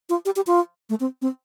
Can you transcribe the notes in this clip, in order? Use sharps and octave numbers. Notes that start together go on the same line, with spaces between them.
F4
G4
G4
F4
A3
C4
C4